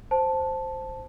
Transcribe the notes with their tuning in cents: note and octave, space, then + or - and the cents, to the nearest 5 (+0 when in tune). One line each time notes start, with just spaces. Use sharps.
C5 +0 A5 +0